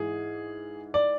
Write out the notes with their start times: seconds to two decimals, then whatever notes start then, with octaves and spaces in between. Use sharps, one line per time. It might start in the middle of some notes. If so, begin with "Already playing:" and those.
Already playing: G#2 E3 G#4
0.94 D5